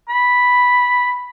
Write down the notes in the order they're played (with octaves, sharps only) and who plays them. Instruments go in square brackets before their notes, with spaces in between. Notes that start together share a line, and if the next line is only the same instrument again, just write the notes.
[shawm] B5